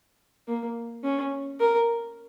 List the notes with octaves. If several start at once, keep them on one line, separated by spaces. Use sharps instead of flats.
A#3
C#4
A#4